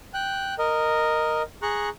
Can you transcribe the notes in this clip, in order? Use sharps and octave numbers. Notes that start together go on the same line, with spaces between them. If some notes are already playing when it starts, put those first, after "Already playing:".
G5 F#6
A#4 D#5
G#4 A#5 C#6 F#6